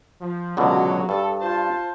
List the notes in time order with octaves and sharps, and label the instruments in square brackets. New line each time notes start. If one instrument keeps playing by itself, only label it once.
[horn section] F3
[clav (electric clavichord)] C#2 B2 D3 [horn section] F#3
[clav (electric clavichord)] G2 [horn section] A4
[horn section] F4 C5 A5